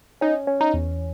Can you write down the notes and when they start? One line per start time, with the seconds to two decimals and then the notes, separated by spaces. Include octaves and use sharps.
0.21 C#4 D#4
0.47 C#4
0.61 D#4
0.74 E2